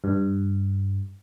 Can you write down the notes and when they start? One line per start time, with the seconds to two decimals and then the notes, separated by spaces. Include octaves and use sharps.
0.04 G2